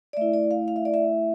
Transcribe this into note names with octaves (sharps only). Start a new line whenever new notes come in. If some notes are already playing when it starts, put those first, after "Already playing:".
D5
A3 E4 E5
D5
F5
F5
E5
D5
E5